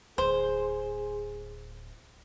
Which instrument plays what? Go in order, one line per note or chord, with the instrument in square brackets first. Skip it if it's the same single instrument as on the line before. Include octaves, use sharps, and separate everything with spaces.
[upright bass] D1 [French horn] G#4 [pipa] C5